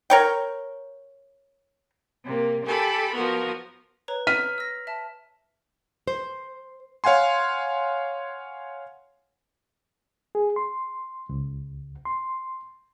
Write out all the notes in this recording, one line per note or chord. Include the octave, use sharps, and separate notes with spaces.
A#4 C#5 G5
C3 A#3
G4 A4 G#5 B5
F3 B3 F#4 A#4
B4 C#5 A#5
F6 B6 D#7
E6 A#6
E5 A5
C5
C#5 F5 F#5 G#5 C6
G#4
C6
C#2
C6